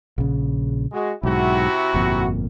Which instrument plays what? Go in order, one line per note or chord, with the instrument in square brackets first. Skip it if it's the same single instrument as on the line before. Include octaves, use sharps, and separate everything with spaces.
[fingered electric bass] A#1 C#3
[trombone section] G#3 F#4
[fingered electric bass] B1 G#2 [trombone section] C3 E4 F#4
[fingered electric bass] G1 F2 A#2